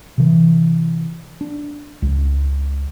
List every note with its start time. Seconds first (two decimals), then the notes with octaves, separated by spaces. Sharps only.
0.18 C3 E3
1.41 D4
2.02 C#2